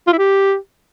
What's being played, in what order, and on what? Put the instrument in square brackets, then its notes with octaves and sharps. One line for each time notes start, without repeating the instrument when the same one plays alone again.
[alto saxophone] F4
E4
G4